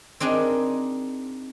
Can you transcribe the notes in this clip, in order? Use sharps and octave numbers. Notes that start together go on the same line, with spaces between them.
C4 D4 D#4 G#4 A#4